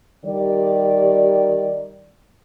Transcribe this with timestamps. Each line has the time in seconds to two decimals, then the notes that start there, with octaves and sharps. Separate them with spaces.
0.25 D#3 G3 G4 D5